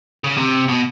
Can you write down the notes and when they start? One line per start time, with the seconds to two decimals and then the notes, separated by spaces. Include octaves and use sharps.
0.24 C#3
0.37 C3
0.68 B2